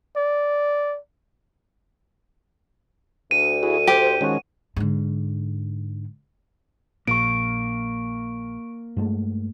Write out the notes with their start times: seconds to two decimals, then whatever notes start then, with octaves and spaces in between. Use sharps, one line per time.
0.16 D5
3.31 D2 D#7
3.63 E4 F#4 G#4
3.87 G4 C5
4.21 D#3 F3 G#3 C#4 F#4
4.77 G#2 D3
7.08 A#1 A#3 C#6 D7
8.97 G2 G#3 A3